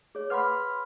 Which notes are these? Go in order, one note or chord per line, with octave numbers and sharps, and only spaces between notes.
G#4 C#5
B4 F#5 B5 C6 D6 F6